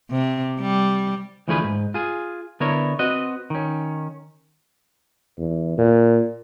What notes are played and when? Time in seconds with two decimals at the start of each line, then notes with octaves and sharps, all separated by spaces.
0.11 C3
0.61 G3
1.48 D2 E3 F3 A3 G#4 B4
1.64 G#2
1.94 F4 G#4
2.60 D3 B3 E4 A#4 C#5
2.99 C4 F#4 B4 D#5
3.50 D#3 C#4
5.38 E2
5.78 A#2